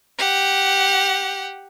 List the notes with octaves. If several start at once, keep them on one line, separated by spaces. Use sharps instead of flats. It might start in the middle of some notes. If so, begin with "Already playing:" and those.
G4 F#5